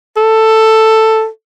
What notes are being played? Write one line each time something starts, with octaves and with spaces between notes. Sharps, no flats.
A4